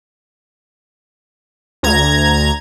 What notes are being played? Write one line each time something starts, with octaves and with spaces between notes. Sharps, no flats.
D2 A#5 G#6